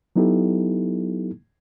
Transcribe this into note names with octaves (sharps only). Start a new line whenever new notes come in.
F#3 B3 D#4 E4 G4 A4